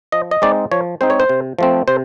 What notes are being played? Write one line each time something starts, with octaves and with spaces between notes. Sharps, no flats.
F3 D#5
D#5
G#3 C4 D#4 D5
F3 C#5
G#3 C4 D#4 C5
C#5
C5
C3
F3 A3 C4
C3 C5